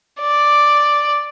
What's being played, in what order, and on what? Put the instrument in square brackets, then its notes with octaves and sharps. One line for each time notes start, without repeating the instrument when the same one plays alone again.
[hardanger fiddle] D5